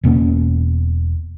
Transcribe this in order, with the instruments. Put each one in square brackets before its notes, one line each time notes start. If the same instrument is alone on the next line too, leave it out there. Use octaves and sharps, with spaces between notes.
[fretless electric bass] E1 B2 A#3 C#4